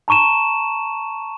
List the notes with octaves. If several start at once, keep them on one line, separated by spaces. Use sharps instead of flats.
A5 A#5 C#6 D#7 E7